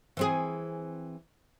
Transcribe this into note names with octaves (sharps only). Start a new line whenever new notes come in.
E3 C4 G#4